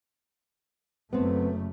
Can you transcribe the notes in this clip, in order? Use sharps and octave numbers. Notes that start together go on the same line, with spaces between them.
F#1 F#2 A3 B3 C4